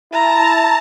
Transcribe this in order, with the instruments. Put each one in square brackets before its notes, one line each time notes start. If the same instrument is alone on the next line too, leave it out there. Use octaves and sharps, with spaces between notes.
[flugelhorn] E4 [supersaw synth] A5 [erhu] A#5